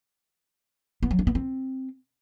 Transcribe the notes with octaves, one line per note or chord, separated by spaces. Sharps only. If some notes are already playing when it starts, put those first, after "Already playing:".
B3
F#3
D4
B3
C4